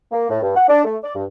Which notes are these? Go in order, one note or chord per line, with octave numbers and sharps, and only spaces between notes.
A#3
A2
G2
F#5
D4
A3
D5
G2